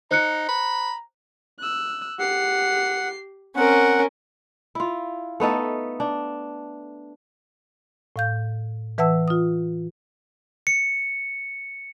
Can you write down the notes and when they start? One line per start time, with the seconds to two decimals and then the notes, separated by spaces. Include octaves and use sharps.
0.11 D#4 C5 A#5 F#6 C#7
0.49 B5
1.60 E6 F#6
2.19 G4 F#5 C7
3.56 C4 C#4 A#4 F#5
4.75 E4 F4
5.40 A3 B3 D#4 A4
6.00 D4
8.16 A2 F5 G6
8.98 E3 B4 E5 F#5 A5 E6
9.28 F4 D#6
10.67 C#7